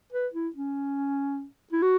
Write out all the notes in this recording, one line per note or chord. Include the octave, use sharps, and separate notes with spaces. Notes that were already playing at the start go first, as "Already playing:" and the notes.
B4
E4
C#4
E4
F#4